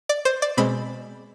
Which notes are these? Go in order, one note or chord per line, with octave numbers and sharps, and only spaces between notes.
D5
C5
D5
B2 G#3 C4 B5